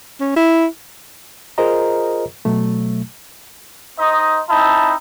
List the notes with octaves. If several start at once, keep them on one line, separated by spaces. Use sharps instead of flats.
C#4
E4
F4 G#4 A#4 C5 D#5 A#5
B2 F#3 A3
D#4 C5 D#5
C4 D#4 E4 A5